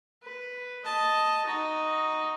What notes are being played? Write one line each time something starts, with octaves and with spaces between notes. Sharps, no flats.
B4
D#5 A5
D#4 F#4